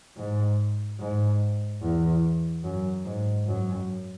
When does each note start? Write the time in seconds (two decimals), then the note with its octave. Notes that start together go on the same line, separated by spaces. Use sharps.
0.17 G#2
1.00 G#2
1.82 E2
2.64 F#2
3.05 G#2
3.47 F#2